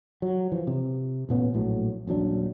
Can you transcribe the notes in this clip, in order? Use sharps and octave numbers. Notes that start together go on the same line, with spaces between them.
F#3
E3 F3
C3
A1 A#2 B3 C#4
A#1 A2 F#3
D#1 A#1 F#3 D4